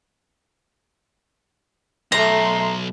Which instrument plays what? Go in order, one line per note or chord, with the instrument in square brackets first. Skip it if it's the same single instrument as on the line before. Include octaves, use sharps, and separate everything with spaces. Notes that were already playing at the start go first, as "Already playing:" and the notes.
[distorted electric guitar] B1 [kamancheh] A3 C6 [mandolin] A#5